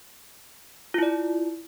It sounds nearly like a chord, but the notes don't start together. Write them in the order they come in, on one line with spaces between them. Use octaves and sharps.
F4 E4 D5